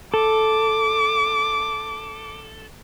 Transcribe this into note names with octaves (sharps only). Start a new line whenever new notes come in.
A4 D6